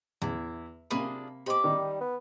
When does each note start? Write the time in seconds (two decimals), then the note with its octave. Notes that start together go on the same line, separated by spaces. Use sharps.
0.22 E2 E4
0.91 C3 A#3 D4 F4 G#4 B5
1.46 G4 C5 D#5 B5 D6
1.64 D#3 G3 D#4
2.01 B3